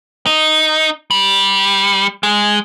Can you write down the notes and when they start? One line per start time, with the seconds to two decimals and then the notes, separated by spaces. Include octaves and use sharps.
0.26 D#4
1.11 G3
2.23 G#3